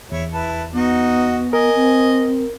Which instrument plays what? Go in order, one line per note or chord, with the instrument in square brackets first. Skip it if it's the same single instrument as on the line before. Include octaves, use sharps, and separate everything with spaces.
[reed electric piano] E2 [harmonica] E4 C#5
[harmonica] E4 B4 A5
[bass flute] B3 [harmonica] D#4 F#4 D#5
[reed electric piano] A#4 [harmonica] D#5 G#5
[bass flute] C4